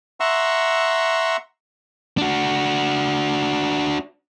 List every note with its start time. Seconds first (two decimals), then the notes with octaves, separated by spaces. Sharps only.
0.20 E5 F#5 A#5 C6 C#6 E6
2.18 D4 F#4